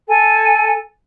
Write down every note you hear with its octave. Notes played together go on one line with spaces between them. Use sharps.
A4 G#5